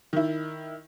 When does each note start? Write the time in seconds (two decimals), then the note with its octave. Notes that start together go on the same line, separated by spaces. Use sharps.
0.13 D#3 E4